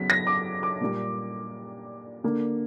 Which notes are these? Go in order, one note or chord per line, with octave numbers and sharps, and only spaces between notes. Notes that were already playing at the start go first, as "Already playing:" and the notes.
Already playing: C#3 F#3 B3 B6
A#6
D6
D6
A#2 G3 A#3
D3 A#3